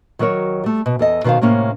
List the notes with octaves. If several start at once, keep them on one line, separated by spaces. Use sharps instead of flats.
D#3 F#3 F#4 A#4 C#5
G3 A3
B2
E2 A4 D#5
B2 D#3 B4 C5 F5
A2 C3 A#3 C#4 C#5